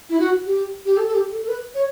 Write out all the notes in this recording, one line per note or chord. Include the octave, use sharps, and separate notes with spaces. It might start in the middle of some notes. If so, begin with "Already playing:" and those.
E4
F#4
G4
G4
A4
A4
G4
A4
A4
B4
C#5